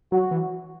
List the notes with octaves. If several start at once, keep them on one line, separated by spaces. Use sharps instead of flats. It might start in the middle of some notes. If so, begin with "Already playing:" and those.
F#3 F#4
E3